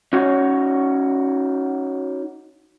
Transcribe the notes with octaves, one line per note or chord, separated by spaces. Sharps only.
C#4 D#4 F#4 C#5